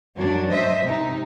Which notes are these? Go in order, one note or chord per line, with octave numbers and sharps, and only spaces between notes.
F#2 F#3 D4
C5 D#5 E5
C3 D#4